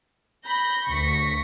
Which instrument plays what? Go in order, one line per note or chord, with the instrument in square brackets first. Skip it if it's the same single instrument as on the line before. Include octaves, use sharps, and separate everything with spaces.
[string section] B5 G6 A#6
D2 C#6 A#6 B6 C#7